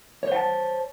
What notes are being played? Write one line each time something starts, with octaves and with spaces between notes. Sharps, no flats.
C5 C#5 F#5 A5